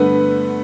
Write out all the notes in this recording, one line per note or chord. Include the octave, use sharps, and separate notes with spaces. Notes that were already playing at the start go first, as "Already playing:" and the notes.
Already playing: G2 D3 A3 B3 B4